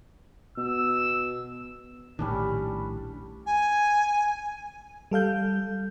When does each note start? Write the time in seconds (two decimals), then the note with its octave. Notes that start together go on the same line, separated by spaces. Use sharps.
0.58 B2 E6
2.19 A#1 A2 D#3 G3 C#4 D4
3.46 G#5
5.11 G3 A4 F5 G6